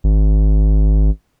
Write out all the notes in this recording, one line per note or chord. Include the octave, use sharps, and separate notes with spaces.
G#1